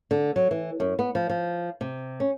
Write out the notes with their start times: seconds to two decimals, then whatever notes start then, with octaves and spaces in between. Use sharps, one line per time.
0.11 D3
0.36 F#3
0.51 E3
0.80 F#2
0.99 B3
1.15 F3
1.29 F3
1.81 C3
2.20 C#4